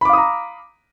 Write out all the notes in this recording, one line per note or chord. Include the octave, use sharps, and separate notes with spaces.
F5 A#5 B5 D6 D#6